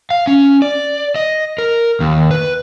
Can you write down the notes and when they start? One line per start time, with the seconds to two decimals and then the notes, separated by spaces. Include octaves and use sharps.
0.10 F5
0.27 C#4
0.62 D5
1.15 D#5
1.58 A#4
2.00 D#2
2.31 B4